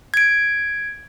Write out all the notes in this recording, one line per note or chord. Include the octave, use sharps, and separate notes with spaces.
G#6 D7